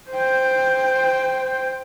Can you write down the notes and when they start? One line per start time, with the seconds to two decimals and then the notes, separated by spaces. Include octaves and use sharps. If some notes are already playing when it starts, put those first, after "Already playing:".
0.11 C5 G5